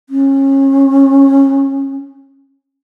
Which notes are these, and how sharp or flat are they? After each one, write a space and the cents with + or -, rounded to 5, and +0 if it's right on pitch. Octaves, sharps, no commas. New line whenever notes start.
C#4 -25